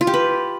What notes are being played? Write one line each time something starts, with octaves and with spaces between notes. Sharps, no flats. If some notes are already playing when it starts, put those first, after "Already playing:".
F4
G4
B4